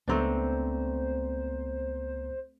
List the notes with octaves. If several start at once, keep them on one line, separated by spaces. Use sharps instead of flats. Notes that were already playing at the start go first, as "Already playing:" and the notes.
C#2 A3 B3 C4 D4 C5 A#5